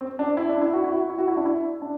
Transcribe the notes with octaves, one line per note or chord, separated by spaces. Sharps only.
C4
D4
E4
D4
E4
F#4
E4
F#4
E4
F#4
E4
D4
E4
D4